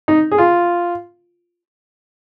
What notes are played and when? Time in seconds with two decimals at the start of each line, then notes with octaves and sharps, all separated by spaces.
0.08 D#4
0.31 G#4
0.38 F4